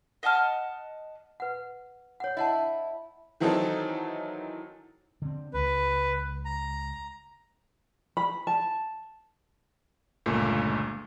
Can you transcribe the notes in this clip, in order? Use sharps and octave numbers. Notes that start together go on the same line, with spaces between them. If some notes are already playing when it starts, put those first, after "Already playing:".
D#5 F#5 A5 F6
B4 F#5
C#5 F#5
E4 D#5 F#5 A5
D#3 E3 F#3 C4 D#4 A4
D3 C4
C#2 B4
A#5
B5
A5
G1 C#2 A#2 A3